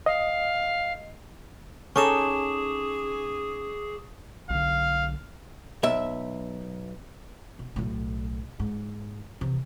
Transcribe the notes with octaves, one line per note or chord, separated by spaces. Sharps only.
D#5 F5
C#4 D#4 G#4 A4 C#6 D6 E7
B1 D3 F5
B1 E5
B2
B1 A2
G#2
C3 E3